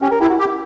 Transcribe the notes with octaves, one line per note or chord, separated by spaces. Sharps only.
C#4 G4
A#4
E4 G4
F#4
G4